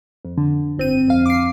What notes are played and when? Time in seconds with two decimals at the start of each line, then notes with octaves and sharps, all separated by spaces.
0.25 F2
0.37 D3
0.78 G1 C4 D#7
1.08 F2 F5
1.26 D6 C7